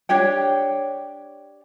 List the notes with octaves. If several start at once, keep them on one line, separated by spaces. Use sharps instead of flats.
D4 G4 C#5 G5